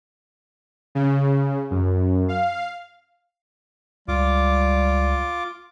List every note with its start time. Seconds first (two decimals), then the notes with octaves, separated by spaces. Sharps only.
0.95 C#3
1.71 F#2
2.29 F5
4.08 C#2 G3 F4 D6